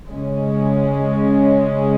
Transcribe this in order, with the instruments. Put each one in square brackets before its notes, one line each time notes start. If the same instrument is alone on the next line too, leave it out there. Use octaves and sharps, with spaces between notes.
[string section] C#3 G#3 C#4